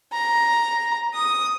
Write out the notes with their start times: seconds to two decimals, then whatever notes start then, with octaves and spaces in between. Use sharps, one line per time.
0.13 A#5
1.15 D#6